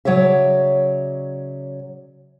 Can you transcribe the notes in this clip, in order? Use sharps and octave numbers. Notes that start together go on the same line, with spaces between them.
C#3 F#3 C#5 D5 E5